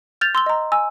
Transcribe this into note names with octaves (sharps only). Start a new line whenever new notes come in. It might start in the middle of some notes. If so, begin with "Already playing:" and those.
F6 G6 A6 F7
C6 E6 G7
D#5 A#5
G#5 E6